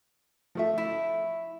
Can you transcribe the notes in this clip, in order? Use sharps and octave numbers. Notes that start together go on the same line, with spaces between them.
F3 A3 E5
E4